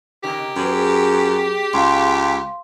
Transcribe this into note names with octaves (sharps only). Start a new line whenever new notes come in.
C3 D#4 G4 A#4
F#2 B3 G#4
C#2 F5 C6